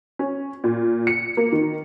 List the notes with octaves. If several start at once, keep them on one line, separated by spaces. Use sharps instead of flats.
C#4
A#2
C#7
A#3
D#3